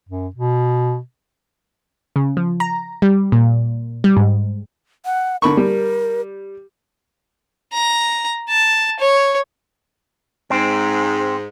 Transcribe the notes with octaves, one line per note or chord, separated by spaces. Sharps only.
F#2
B2
C#3
F3
A#5
G3
A#2
G3
G#2
F#5
D3 A#4 B5 C#6
G3
A#5
A5
C#5
G#2 C4